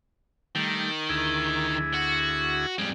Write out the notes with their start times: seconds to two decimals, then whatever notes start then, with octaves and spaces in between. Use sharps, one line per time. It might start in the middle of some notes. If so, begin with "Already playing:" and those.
0.55 D#3 G3 A3
1.09 D2 E4 G#4
1.94 F#4
2.78 F2 G3 G#3